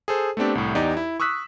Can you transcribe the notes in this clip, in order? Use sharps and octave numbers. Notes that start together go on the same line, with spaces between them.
G#4 A4 C5
A3 B3 C4 D4 G4
C2 A2
E2 D#4 G4 D5
E4
C#6 D#6 E6 F#6 B6